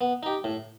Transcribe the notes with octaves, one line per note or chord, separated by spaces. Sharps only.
B3
D#4 G4
A2